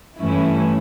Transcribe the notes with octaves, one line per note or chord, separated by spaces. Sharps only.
G2 E3 A3 C#4 E4